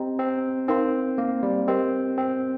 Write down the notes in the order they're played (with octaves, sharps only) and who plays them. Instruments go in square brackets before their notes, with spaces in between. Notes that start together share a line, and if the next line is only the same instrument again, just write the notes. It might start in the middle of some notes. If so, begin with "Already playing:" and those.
Already playing: [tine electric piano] C4 [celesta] G4 D#5 A#5
[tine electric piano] C4
[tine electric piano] C4 [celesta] D#4 A#4 F5 C6
[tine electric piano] A#3
G3
[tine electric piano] C4 [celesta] G4 A#4 D#5 C6
[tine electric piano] C4